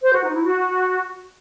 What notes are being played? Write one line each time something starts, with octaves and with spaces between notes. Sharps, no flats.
C5
F#4
D#4
E4
F#4